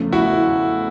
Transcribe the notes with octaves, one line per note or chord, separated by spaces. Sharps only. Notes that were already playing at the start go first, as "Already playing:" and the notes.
Already playing: E2 C#3 F3 A3
E4 F#4